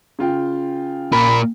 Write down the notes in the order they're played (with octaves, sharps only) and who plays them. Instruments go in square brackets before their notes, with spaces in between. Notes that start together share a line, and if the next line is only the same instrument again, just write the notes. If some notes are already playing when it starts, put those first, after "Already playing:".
[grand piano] C#3 F4 G5
[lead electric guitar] A#2 A#4 [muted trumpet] B5